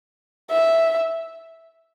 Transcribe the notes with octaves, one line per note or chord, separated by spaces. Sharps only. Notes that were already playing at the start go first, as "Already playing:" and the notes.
E5